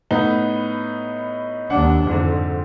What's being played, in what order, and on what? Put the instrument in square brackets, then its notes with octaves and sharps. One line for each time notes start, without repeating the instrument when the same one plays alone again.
[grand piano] A2 B3 D#4
[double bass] D#2 D4 [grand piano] F#5
[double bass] F2 [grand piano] G#2 D3